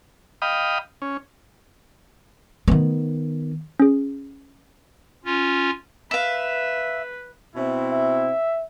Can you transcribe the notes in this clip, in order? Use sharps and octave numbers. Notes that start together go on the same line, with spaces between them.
D#5 F5 G5 B5 D#6
C#4
D#3 B3
C#4 G#4
C#4 F4
B4 E5 F5
B2 C4 E4
E5